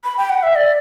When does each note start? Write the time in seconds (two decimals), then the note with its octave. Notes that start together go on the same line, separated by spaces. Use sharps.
0.04 B5
0.17 G5
0.30 F#5
0.43 E5
0.55 D5